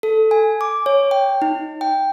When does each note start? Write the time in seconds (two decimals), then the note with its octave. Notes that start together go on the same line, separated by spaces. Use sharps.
0.03 A4
0.31 G#5
0.61 D6
0.86 C#5
1.11 G5
1.42 D#4
1.81 G5